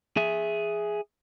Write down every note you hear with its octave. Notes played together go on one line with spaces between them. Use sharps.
G#4 E5